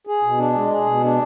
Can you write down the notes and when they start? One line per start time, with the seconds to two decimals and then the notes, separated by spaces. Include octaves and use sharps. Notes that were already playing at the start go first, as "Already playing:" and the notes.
0.07 G#4
0.23 B2
0.38 D4
0.54 G#3
0.70 G#4
0.87 B2
1.03 D4